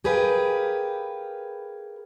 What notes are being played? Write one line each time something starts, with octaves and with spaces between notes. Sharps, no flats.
G4 G#4 A#4 B4 F5 G5